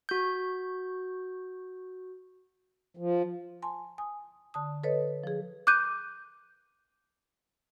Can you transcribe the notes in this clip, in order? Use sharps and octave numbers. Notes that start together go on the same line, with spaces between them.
F#4 G6
F3
G#5 A5 C6
G#5 D#6
D3 A5 D#6
A4 B4 C#5 D#5
F3 G#4
D6 F#6 G6 D#7